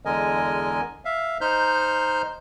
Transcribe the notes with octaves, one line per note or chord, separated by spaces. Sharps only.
E2 D3 G#3 A#4 D#5 G#5
E5 F5
D#4 C5 F6 G6